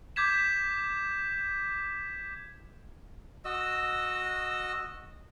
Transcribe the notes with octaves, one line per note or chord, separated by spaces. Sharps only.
D6 G6 G#6 B6 E7
F#4 D#5 E6